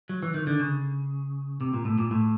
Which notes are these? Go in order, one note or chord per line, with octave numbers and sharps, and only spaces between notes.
F#3
E3
D#3
D3
C#3
C3
A#2
A2
A#2
A2